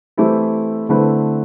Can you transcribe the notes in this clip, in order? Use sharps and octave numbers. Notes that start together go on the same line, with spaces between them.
E3 A3 C4 E4 G4
D3 A3 C4 E4 B4